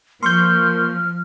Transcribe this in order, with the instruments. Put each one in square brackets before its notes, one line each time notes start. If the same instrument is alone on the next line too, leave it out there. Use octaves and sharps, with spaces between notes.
[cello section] F3 [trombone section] A#3 [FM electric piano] C6 C#6 G6 [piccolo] F6